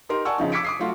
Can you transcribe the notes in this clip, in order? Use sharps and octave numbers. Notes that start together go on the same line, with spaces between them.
D#4 G4 A#4 C6
D5 F#5 G#5 A5 C#6 E6
C#3 F3 D#4
D6 E6 G#6 B6 C#7 D7
D6 D#6 C7
F#3 A3 F4 F#4